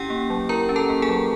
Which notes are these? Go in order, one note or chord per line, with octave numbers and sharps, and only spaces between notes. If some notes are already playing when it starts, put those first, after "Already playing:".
Already playing: C#4 E4 G4 F#5 G5
A#3
F#3
E4 A#4 A#5
C#4
A4 A5
A#3
G#4 G#5
F#3